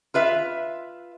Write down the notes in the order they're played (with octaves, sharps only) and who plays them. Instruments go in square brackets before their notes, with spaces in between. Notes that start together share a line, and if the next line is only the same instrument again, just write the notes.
[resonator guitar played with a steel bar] F4 B4 E5